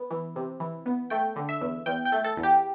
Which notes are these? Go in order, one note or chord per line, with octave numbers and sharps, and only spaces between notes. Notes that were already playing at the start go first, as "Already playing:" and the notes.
Already playing: B3
E3
C3
E3
B3
A3 G5
D3
E5
E2
E2 G5
G5
A3
A4
E2
G4